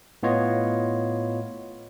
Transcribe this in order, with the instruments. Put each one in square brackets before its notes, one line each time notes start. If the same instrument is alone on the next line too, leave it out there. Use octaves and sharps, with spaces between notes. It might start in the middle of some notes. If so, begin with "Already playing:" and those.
[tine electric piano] A2 B3 F4 C#5 D#5